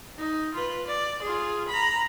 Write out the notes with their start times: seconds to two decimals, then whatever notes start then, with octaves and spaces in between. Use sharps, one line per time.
0.18 D#4
0.54 F4 B4
0.87 D5
1.22 F4 G#4
1.68 A#5 B5